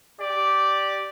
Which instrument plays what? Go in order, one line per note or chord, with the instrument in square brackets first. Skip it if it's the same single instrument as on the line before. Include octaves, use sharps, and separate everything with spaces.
[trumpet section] G4 D5